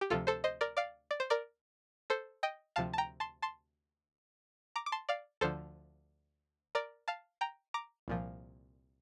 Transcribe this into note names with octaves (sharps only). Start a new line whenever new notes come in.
G4
D2 C3 F3 F4 A4
A4 C5
C5 D#5
A#4 D5
D5 F5
D5
C5
A#4 D5
A4 C5
D#5 G5
D2 C3 F3 F5 A5
A5
G5 A#5
A5 C6
A5 C6
A#5 D6
D6
A5 C6
D5 F5
D2 D3 F3 A4 C5
A#4 D5
F5 A5
G5 A#5
A#5 D6
C2 A#2 F3